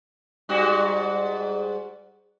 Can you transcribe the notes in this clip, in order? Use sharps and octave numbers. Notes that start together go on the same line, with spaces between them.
G#2 G3 F#4